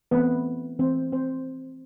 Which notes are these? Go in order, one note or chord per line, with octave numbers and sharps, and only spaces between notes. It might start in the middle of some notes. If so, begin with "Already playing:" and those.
E3 A3 B3 C4 B4
E3 A3 C4 C5
C4 C5